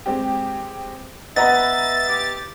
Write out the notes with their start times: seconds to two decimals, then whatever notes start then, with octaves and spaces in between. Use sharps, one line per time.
0.06 G#3 C4 G4
1.36 B3 D#5 E5 F#5 A#5 B5 A6
2.08 G4